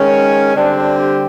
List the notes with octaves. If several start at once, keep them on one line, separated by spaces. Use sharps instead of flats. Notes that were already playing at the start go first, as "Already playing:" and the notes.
Already playing: D#3 G#3 C#4
D3 G3 C4 D4
G4